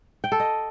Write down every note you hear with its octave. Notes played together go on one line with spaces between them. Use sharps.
G5
A4
D#5